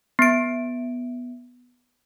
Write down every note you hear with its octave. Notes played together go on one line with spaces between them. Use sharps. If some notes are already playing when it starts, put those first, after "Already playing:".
B3 D7